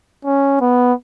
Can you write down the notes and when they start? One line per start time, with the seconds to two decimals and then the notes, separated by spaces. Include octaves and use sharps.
0.25 C#4
0.61 B3